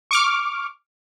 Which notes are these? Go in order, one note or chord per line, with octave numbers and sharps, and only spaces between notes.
C#6 D6 F6